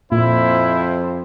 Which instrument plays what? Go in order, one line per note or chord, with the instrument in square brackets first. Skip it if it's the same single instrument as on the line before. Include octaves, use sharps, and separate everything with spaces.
[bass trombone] F2 [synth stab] A#2 [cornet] E4 [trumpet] C5